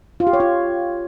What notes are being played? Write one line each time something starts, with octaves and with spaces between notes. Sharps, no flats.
F4
G4
C#5
F4